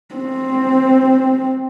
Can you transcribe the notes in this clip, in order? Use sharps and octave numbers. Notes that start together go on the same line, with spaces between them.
C4